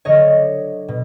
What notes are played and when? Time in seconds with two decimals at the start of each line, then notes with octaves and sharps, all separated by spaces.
0.05 D3 F#3 C#5 D#5
0.88 B2